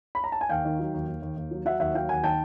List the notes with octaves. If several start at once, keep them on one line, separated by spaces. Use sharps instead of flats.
B5
A#5
A5
G#5
D#2 F5 G5
D#3
F#3
D#2
D#2
D#2
D#2
F#3
F#3 E5 F#5
D#2 E5 F#5
F#3 F5 G5
D#2 F#5 G#5
D#3 G5 A5